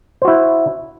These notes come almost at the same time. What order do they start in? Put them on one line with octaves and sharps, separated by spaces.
C5 F#4 E4